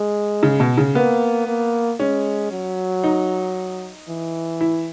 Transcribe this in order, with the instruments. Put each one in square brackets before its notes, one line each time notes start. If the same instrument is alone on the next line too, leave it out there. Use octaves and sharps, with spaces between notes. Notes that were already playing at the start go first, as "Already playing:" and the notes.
Already playing: [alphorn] G#3
[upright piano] C#3
B2
C#3
[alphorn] A#3 [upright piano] B3
[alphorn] A#3
[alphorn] G#3 [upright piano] C#4
[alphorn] F#3
[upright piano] D#4
[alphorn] E3
[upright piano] E4